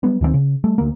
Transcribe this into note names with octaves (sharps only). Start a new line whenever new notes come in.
F#3 G3 B3
D2 D#3 F3 C4
C#3
G3 A3
D2 A#3